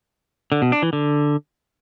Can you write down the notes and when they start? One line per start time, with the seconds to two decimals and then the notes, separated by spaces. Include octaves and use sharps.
0.52 D3
0.62 B2
0.72 D4
0.82 E3
0.93 D3